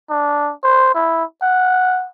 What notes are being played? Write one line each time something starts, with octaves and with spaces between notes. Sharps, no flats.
D4
C5
E4
F#5